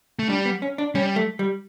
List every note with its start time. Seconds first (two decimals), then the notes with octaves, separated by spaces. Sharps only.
0.19 A3
0.29 G3 D4
0.45 B3
0.62 C#4
0.78 D4
0.95 G3 C#4
1.16 A3
1.39 G3